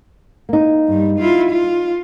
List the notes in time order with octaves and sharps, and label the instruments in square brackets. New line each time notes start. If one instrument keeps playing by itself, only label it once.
[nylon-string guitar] A#3 D#4
[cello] G2 G3
E4 F4
F4